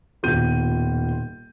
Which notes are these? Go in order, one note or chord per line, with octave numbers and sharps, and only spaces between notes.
D#1 B2 F4 G6 D#7